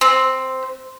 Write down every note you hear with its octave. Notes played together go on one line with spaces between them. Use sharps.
C4